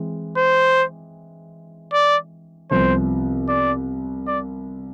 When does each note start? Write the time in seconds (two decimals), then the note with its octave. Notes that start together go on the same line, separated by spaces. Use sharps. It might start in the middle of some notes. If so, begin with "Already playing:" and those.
Already playing: E3 G#3 C4
0.37 C5
1.93 D5
2.71 C2 C3 F3 B3 C5
3.49 D5
4.27 D5